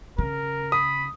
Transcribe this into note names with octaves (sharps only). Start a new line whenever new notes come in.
C#3 A#4
B5 D#6